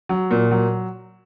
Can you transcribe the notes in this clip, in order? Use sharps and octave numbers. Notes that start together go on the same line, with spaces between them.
F#3
A#2
F#3